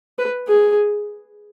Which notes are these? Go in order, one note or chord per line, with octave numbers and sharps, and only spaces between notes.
B4
G#4